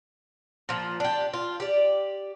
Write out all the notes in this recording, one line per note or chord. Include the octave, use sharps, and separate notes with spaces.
A#2 F3
D4 G4
F4
G4 D5